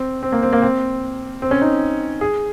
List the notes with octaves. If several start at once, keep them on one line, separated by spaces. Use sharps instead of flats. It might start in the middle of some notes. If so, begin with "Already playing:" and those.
Already playing: C4
C4
A#3
C4
A#3
C4
C4
C#4
D#4
G#4